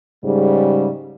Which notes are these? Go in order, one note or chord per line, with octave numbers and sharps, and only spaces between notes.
G#2 C#3 G3